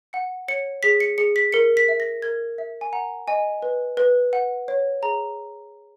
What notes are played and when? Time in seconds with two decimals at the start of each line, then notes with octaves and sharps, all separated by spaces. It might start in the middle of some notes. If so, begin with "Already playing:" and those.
0.13 F#5 C#7
0.48 C#5 C#7
0.83 G#4 B6
1.00 C#7
1.18 G#4 C#7
1.36 B6
1.53 A#4 C#7
1.77 B6
1.88 E5
2.00 A#6
2.22 A#4 G#6
2.58 E5
2.81 G#5
2.93 F#5 A#5
3.28 D#5 G#5
3.62 B4
3.97 B4
4.33 F#5
4.68 C#5
5.02 G#4 A#5